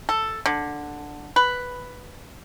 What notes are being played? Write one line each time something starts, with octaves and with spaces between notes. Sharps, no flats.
A4
D3
B4